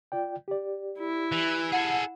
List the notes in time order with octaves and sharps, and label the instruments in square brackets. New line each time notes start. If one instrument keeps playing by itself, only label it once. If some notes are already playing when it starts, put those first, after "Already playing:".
[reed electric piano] F4 D5 G5
G4 D5
[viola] E4
[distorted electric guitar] E3
[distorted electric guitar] G#4 A4 [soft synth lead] F#5